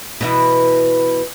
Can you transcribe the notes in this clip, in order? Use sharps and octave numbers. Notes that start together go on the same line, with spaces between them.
B2 E3 E4